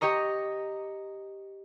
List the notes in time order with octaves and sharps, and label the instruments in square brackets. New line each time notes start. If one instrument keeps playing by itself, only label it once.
[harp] G4 C#5 D#5 A#5